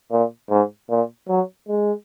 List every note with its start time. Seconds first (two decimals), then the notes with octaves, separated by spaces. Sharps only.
0.11 A#2
0.50 G#2
0.90 A#2
1.29 F#3
1.68 G#3